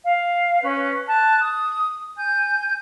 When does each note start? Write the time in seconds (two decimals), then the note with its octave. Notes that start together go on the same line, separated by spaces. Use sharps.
0.04 F5
0.62 C#4 B4
1.07 A5 F#6
1.40 D#6
2.17 G#5 G6